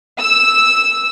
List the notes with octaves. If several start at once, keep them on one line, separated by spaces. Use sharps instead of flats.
E6